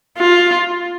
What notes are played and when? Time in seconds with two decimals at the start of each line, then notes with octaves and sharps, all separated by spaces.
0.18 F4